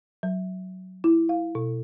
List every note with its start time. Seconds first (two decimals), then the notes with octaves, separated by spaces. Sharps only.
0.23 F#3
1.04 E4
1.29 F5
1.55 B2